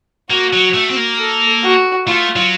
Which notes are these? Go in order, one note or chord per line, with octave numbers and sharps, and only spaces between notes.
A#3 F#4
F#3
A3
C4
A#3
A4
F#4
A3 F4
F#3